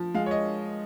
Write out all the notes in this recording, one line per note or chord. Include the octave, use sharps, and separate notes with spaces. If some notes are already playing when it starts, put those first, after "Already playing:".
Already playing: F3
G#3 F5
C#5
D#5